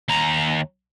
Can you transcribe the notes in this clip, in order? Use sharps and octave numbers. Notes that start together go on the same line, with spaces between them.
D#2 A#5